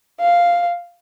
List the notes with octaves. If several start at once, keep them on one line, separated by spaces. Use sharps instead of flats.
F5